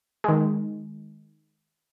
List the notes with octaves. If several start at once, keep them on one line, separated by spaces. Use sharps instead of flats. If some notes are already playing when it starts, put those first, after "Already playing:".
D#3 G#3